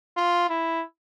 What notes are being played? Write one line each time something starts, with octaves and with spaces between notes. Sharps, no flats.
F4
E4